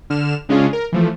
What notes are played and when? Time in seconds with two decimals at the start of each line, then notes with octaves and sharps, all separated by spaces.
0.10 D3 F6 E7
0.49 C#3 G#3 C#4 D4 F4 G#4
0.73 A#4
0.92 E3 F3 A3